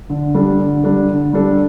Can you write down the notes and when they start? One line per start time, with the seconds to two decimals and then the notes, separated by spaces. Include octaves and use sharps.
0.10 D3
0.34 G3 D4 A4
0.60 D3
0.84 G3 D4 A4
1.09 D3
1.33 G3 D4 A4